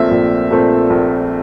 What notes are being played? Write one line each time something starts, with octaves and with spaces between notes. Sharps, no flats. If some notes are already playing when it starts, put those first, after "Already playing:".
Already playing: A#1 A#2 A3 C4 E5
A#1
A#2 A3 C4
A#1